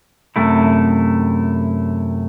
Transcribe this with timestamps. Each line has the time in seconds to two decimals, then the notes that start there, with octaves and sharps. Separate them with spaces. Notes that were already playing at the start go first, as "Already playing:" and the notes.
0.36 F#2 C3 A3 E4